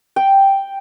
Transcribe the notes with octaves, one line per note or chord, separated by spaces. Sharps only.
G5